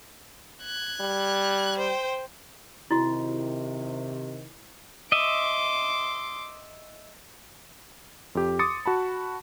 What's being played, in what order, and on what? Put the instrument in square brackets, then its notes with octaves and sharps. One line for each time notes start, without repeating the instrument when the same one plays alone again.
[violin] F#6 G#6
[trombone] G3
[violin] C5 G5
[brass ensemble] C3 D#3 [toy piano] E4 F#4
[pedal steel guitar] D#5 E5 [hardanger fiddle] C6 D6
[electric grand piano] F2 G4
C6 D6 D#6 A6 C#7
F#4 A5 B5